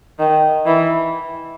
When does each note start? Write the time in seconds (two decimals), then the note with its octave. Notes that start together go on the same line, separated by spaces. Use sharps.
0.19 D#3
0.66 E3